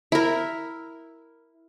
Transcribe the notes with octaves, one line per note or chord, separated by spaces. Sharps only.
E4 A#4